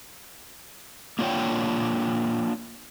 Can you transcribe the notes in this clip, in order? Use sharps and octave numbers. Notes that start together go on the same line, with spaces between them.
A#3 D4 F4 C#5 F#5 G5